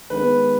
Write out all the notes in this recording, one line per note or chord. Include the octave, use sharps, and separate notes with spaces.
D#3 G#3 B3 B4